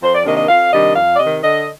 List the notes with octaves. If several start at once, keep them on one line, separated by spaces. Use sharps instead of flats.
F2 C5
D5
C3 D#3 A#3 D4 D#5
D#5
F2 F5
C3 D#3 G3 D4 D#5
F2 F5
D5
C3 D#3 D#5
D3 D#5